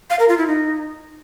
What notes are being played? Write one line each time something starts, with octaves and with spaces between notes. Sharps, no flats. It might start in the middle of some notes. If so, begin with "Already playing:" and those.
F5
A#4
F4
E4
D#4